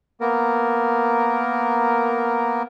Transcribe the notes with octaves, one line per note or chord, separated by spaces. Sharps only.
A#3 B3 A#4